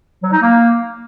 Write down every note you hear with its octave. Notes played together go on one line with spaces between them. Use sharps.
F#3
D#4
A#3